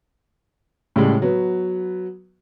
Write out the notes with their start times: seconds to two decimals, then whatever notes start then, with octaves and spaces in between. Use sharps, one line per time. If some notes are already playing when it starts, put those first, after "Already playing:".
0.96 A2 C#3 G3 G#3
1.22 F#3 B3